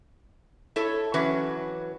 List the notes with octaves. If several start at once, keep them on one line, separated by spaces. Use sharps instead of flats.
E4 A4 C#5
E3 F#3 C#4 B4